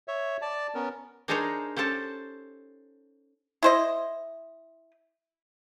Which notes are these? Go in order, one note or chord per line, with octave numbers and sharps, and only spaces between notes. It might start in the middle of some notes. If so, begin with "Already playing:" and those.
C#5 E5
D5 A5
B3 C#4 A#4
D4 D#4 G#4 A#4 C5 C#5
C#4 G4 A4 C5 A5
E4 C5 D#5